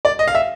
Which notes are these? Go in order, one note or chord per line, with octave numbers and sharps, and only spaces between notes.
D5
D#5
F5
E5